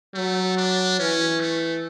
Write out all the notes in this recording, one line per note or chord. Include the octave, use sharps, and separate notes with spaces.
F#3 A3
D4
E3 C#4
A3